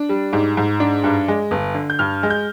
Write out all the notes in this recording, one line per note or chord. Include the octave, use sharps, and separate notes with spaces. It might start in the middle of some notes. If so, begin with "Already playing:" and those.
Already playing: D4
G3
G#2
G#2
D4
G2
G#3
G1
D3
G6
G2 F6
G#3
G6